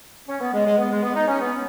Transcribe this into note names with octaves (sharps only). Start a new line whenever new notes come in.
C#4
B3
G#3
G#3
B3
G#3
B3
D#4
C#4
B3